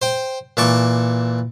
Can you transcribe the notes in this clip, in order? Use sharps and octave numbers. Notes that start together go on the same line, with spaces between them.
C5 G5
A#2 E3 A5 C#6 D6